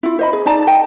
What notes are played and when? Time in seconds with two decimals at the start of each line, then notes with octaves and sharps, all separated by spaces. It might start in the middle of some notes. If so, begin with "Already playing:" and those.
0.03 E4 F4
0.19 C5 D#5 B5
0.33 G#4
0.46 D#4 D5 A5 A#5
0.67 D#5 G5 A5